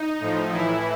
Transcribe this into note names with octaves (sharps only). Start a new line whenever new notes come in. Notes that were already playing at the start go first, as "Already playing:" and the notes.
Already playing: D#4
A2 F3
A2 E3 E4